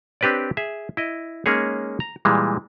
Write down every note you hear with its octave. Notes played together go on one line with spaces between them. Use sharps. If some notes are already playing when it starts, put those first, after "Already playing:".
C4 D4 G4 B4 C#5 D5
G#4 E5
E4 D#5
G#3 A#3 C#4 D#4 G#4 C#5
A#5
A#2 E3 G3 G#3